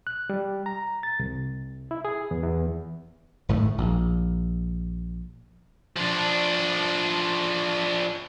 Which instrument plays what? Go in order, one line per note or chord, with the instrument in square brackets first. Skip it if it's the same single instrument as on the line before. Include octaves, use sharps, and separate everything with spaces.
[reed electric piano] F#6
G3
A#5
A6
C2
E4
G#4
E2
E2
[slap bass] G#1 A2 A3
A#1
[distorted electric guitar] F3 D4